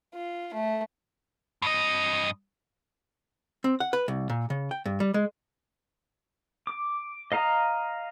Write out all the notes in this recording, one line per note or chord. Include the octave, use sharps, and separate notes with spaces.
F4
A3
G2 D#5
C4
F#5
B4
C2
A#2
C#3
G5
G2
G3
G#3
D6
D#5 F5 A#5 D#6